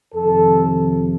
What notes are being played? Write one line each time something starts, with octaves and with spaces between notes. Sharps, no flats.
F2 C3 D#3 A4